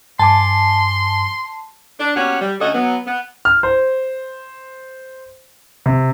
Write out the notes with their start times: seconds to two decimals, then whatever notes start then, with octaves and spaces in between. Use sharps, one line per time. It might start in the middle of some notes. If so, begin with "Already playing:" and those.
0.19 G2 G#5 A5 C6 D6
2.00 D4
2.16 B2 A#3 C#4 G4 C#5 F#5
2.41 G3
2.60 D2 A3 C#4 F#4 A4 D#5
2.74 F#3 B3
3.07 B3
3.45 F6
3.63 C5
5.86 C3